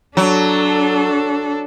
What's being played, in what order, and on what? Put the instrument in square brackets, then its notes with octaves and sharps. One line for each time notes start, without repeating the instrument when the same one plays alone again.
[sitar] F#3 [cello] D4 A4